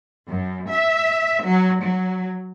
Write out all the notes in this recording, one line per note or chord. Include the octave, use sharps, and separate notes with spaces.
F#2
E5
F#3
F#3